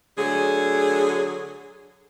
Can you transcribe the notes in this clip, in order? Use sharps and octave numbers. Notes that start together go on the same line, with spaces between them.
D3 F#3 A3 G#4